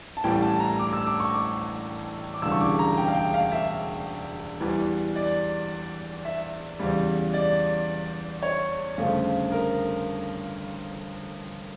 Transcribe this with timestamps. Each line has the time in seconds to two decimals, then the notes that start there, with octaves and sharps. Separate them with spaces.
0.17 A5
0.24 A1 A2 E3 G3 G5
0.42 A5
0.60 A#5
0.79 D6
0.93 E6
1.07 D6
1.20 C#6
1.34 D6
2.34 D6
2.42 E1 D2 C#3 E3 G3 E6
2.52 C#6
2.61 D6
2.79 A#5
2.98 G5
3.08 F5
3.15 G5
3.34 F5
3.52 E5
4.60 E2 E3 G3
5.16 D5
6.25 E5
6.79 E2 C#3 G3
7.34 D5
8.43 C#5
8.98 G1 F2 C#3 F3 A3
9.52 A#4